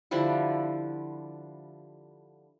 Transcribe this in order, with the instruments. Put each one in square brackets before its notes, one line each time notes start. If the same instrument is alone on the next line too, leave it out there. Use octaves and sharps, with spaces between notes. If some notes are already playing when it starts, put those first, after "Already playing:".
[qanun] D3 F3 G3 E4